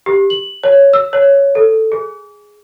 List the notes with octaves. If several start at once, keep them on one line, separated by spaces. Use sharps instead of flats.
G4
F#7
C#5
E6
C#5
A4
G#4